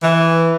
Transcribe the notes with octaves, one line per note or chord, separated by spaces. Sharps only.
E3